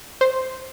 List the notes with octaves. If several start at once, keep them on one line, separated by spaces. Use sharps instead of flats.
C5